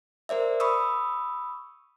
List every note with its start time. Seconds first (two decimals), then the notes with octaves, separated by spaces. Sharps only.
0.29 A#4 C5 D5 E5
0.60 B5 C#6 D#6 E6